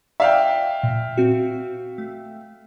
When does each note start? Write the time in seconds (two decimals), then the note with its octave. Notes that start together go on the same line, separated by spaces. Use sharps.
0.20 D5 E5 F5 G5
0.83 A#2
1.17 C4 F#4
1.98 A3